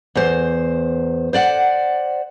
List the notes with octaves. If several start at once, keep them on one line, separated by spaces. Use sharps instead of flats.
E2 C5
C5 D5 F#5